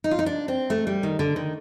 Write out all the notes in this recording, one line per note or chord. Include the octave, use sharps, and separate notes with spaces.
D#4
F4
D#4
D4
C4
A3
G3
D#3
D3
D#3